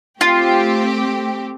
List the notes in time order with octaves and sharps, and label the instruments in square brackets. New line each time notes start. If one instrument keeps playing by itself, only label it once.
[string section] A3 C4 G4 [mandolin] F4